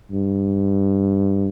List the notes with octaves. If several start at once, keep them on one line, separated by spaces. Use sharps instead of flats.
G2